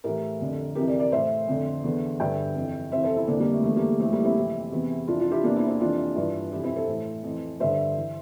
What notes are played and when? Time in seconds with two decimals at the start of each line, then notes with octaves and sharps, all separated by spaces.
0.04 A2 E3 G4 A#4
0.41 F2 D3
0.75 F2 C3 E3 G4 A#4
0.87 A#4 D5
1.00 A#4 D5
1.12 A2 E3 C5 E5
1.48 F2 D3
1.84 E2 D3
2.20 G2 D3 E5 G5
2.55 F2 E3
2.92 F2 C3 E3 C5 E5
3.03 A4 C5
3.17 C4 E4
3.27 F2 D3 A#3 D4
3.40 G3 A#3
3.52 A3
3.60 G3
3.63 E2 D3 A3
3.76 G3 A#3
3.99 F2 E3 A3 C4
4.12 G3 A#3
4.25 C4 E4
4.36 F2 C3 E3
4.72 E2 C3 E3
5.08 F2 C3 E3 D4 F4
5.20 D4 F4
5.32 E4 G4
5.44 E2 C3 E3 A#3 D4
5.56 C4 E4
5.68 C4 E4
5.80 F2 C3 E3 D4 F4
6.16 G2 E3
6.52 F2 C3 E3 E4 G4
6.64 C4 E4
6.76 A4 C5
6.88 A2 E3
7.24 F2 E3
7.60 G2 D3 C5 E5
7.96 E3